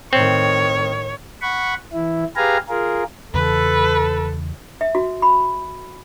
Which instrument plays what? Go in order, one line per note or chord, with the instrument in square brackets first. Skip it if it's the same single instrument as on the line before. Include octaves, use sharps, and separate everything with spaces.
[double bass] A2 D#3 [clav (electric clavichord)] C4 [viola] C#5
[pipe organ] F#5 B5 C#6
E3 E4
G4 G#4 B4 F5 G#5 A#5
F4 G#4 A#4
[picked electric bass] E2 C#3 E3 [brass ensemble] A4 [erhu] B4
[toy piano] E5
F#4
B5